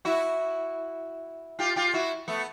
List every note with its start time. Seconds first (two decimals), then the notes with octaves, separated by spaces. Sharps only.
0.05 E4 F#4
1.59 F4 G4
1.76 F4 G4
1.94 E4 F#4
2.28 A3 B3